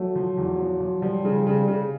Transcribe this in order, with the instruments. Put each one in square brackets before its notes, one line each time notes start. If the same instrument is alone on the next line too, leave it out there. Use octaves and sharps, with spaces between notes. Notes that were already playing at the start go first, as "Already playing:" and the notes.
Already playing: [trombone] F#3 [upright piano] A3
[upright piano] F3
E2
F3
F3
[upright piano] F3 [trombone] G3
[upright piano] C#3
C#3
C#3